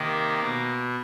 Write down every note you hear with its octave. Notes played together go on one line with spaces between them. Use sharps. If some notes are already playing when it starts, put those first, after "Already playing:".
Already playing: C3 D#3 A#3
B2